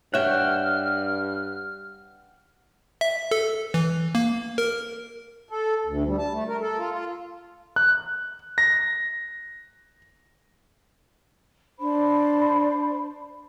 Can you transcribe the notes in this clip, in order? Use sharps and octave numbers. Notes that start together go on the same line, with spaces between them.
G2 C#5 E5 F#5 G5 F6
E5
A4
E3
A#3
A#4
A4
D2
G3
A5
A3
A#4
A4
F4
F4
F#6
A#6
D4 C5 B5